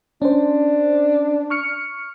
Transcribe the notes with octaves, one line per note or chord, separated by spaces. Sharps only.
C#4 D4 C5
C#6 F6 C#7